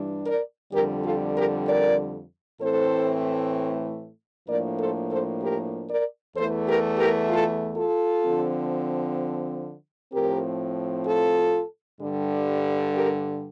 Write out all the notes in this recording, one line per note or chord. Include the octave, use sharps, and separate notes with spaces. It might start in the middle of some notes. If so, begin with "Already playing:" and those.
Already playing: G2 E3 G3 D4
A#4 D5
F2 D3 G3 G4 A#4
F4 A4
G4 A#4
A#4 D5
A2 E3 A3 C4 A4 C5
A2 F3 A#3 D4 A#4 D5
A4 C5
A4 C5
G4 A#4
A#4 D5
E2 E3 A3 A4 C5
G4 A#4
G4 A#4
F4 A4
F4 A4
D3 F3 C4
A2 F3 C4 G4 A#4
F4 A4
G2 D3 G3
G4 A#4